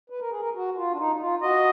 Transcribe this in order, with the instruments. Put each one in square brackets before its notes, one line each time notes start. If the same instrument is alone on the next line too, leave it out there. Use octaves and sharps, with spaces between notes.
[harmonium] B4
A#4
G#4
A#4
F#4
F4
D4
D#4
D#4
F4
[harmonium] F#4 [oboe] D#5